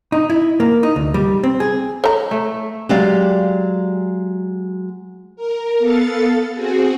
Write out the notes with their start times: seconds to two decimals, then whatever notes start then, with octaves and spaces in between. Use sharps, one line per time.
0.12 D#4
0.30 E4
0.60 A#3
0.83 D#4
0.96 D2
1.14 G3
1.43 C4
1.60 G#4
2.04 A4 C#5 A#5
2.31 A3
2.89 F#3 G#3 G4 D5 F5
5.36 A#4
5.79 B3 A4 F5 A6 C#7
6.54 C4 F#4 G#4